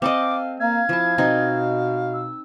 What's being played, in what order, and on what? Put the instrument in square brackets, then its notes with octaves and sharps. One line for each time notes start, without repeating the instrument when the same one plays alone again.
[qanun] C4 A4 D#5 [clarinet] F5 [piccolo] D6
[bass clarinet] A#3 [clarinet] F5 [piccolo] G#6
[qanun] F3 A5 [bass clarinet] E4
[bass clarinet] B2 [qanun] C4 D#4 A#4
[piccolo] E6